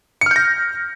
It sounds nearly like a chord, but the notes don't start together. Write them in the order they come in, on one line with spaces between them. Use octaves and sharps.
C#7 F6 G6 A#6